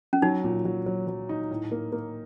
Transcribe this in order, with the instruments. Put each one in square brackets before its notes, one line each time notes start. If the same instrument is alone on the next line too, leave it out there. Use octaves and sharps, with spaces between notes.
[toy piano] C#4
[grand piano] F#3 [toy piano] D#4
[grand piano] A#2
F#3
F#3
F#3
D#4
A2
A#3
A#3